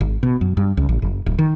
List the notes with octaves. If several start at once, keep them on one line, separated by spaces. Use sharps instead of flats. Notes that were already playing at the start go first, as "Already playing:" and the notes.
G#1
B2
F#2
G2
C#2
A1
F#1
D1
D#3